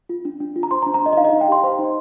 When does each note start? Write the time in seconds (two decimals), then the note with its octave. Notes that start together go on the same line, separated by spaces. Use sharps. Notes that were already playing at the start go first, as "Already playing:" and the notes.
0.09 F4
0.25 D4
0.41 D4
0.56 F4
0.63 A#5
0.71 C5 C6
0.82 A#5
0.87 D4
0.94 A#5
1.02 D4 D#5
1.13 D#5
1.17 D#4 F5
1.25 D#5
1.29 F5
1.33 D#4
1.41 G5
1.48 G4 C6
1.64 C5
1.79 D#4